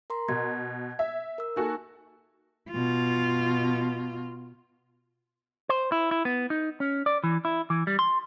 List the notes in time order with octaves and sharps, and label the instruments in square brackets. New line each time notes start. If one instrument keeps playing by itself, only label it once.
[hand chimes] A#4 A#5 C6
[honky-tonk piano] B2 [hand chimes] G#6
[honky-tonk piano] E5
[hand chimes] A#4 E6
[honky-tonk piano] A#3 F#4 A4 [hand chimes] D#4 G#5
[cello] B2 F4
[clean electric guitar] C5
E4
E4
B3
D#4
C#4
D5
E3
E4
E3
G3
C6